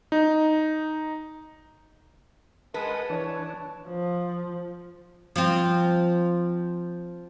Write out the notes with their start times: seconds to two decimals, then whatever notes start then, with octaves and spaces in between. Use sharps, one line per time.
0.12 D#4
2.74 G#3 A#4 B4 F#5 A5 D#6
3.09 E3 D4 C#5
3.88 F3
5.36 F3 C4